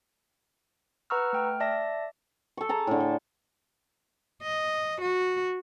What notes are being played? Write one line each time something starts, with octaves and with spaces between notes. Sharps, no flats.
B4 F#5 A#5 C#6 E6 F6
A3 G5 F6
D5 E5 A5 A#6
A4 C#6
G#4 A5 A#5
A2 D3
A4
D#5
F#4